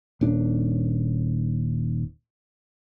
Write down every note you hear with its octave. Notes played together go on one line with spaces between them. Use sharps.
D#1 D4